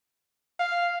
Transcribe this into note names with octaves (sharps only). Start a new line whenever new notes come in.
F5